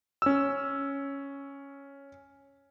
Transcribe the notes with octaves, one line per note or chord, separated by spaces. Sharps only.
C#4 E6